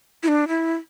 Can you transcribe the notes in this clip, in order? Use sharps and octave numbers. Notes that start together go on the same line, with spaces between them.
E4
D4
E4